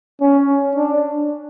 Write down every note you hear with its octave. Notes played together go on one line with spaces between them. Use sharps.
C#4
D4